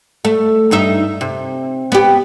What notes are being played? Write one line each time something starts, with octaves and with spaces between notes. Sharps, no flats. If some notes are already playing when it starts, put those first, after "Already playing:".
A3
G2 D#4 E5
C3
B3 G4